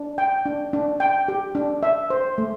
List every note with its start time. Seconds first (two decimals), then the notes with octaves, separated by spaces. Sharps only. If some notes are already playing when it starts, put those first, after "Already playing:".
Already playing: D4
0.18 G5
0.45 D4
0.73 D4
1.00 G5
1.28 G4
1.55 D4
1.83 E5
2.10 C5
2.38 A3